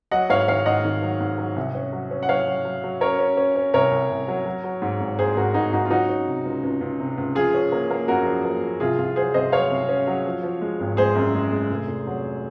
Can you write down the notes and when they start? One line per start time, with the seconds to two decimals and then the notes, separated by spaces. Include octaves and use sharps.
0.11 F#3 D#5 F#5
0.29 G#2 C#5 F5
0.48 D#3 C#5 F5
0.66 G#2 D#5 F#5
0.85 D#3
1.02 F#3
1.20 G#2
1.38 F#3
1.56 C2
1.75 C#4
1.93 F#3
2.11 C#4
2.23 F#5
2.29 F#3 C#5 F5
2.47 F#3
2.65 F#3
2.84 F#3
3.01 C#4 A#4 C#5
3.19 C#4
3.37 C#4
3.56 C#4
3.74 C2 A#4 C#5
3.91 C2
4.10 C2
4.28 F#3
4.46 F#3
4.64 F#3
4.82 G#2
5.00 G#1
5.19 G#1 G#4 C5
5.37 G#2 F#4 A#4
5.54 G#1 D#4 F#4
5.72 G#1 D#4 F#4
5.85 F4
5.90 F#3 D#4 F#4
6.09 C#4
6.27 C3
6.45 C#2
6.63 C#2
6.81 C#2
7.00 C3
7.18 C#2
7.35 F3 F4 G#4
7.54 C#4
7.72 A#3
7.91 A#3
8.08 F#2 F#4 A#4
8.26 F3
8.45 A#3
8.62 F3
8.80 C2 F4 G#4
8.98 C2 F4
9.16 F#3 G#4 C5
9.34 C2 C5 D#5
9.52 F#3 C#5 F5
9.71 C2
9.89 C#4
10.07 F#3
10.26 F3
10.43 F3
10.61 G#3
10.80 G#1
10.97 G#3 G#4 C5
11.16 F#2
11.34 G#3
11.52 G#3
11.70 F1
11.88 F1
12.07 F#3